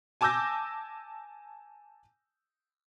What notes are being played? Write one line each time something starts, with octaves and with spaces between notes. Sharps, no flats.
G#5 A5 D6 E6 G6 A#6